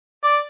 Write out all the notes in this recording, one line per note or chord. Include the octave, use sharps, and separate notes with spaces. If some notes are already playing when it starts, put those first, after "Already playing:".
D5